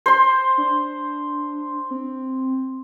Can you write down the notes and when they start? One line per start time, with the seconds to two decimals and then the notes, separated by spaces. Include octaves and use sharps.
0.06 C5 C6
0.58 D4
1.91 C4